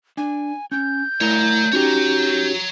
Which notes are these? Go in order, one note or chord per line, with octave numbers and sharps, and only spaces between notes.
D4 G#5
C#4 G6
A3 E4 A#4 C#5 D5 A#5
C#4 D#4 F#4 G4 C#5 A#5